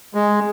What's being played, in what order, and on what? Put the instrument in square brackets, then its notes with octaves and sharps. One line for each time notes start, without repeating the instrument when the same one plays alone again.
[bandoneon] G#3